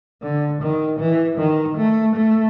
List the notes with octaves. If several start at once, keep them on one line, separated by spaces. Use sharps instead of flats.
D3
D#3
E3
D#3
A3
A3